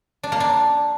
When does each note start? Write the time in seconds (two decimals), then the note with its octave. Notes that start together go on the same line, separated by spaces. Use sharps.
0.23 D4
0.32 A#3
0.40 D4